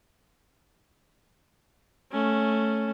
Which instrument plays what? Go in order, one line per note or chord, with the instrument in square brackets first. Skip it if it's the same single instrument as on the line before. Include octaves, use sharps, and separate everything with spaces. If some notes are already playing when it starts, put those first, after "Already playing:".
[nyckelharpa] A3 C#4